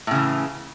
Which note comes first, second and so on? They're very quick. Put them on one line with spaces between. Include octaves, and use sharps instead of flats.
A2 C#3 E3